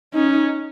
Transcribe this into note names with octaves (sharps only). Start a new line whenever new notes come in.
C#4 D#4